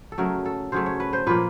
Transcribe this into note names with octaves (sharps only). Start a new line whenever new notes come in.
A4
C#3 F#3 A3 A#4
A4
C#3 F#3 A3 C5
C#5
B4
C5
A#2 F3 A#3 B4